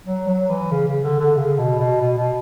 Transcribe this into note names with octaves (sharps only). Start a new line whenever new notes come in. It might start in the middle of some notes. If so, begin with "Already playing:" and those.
F#3
F#3
E3
C#3
C#3
D3
D3
C#3
B2
B2
B2
B2